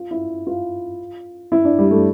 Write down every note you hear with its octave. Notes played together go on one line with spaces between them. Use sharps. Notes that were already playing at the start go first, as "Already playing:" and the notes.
Already playing: F4
E4
F4
E4
D4
G3
A3